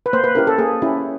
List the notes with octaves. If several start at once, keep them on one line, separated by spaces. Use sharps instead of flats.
B4
A#3 C5
B4
C#4 E4 G4 A#4
A4
A#3 G#4
C#4 E4 G4